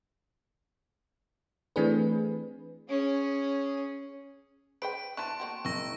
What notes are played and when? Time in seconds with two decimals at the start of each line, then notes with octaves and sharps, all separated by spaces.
1.76 E3 A3 C4 D4 G#4 B4
2.89 C#4 G#4
4.82 G#4 B4 C5 G5 D7
5.17 D4 E4 A5 C6 C#6 F#6
5.40 A#3 C4 F#4
5.65 F#1 C4 C#6 E6 A#6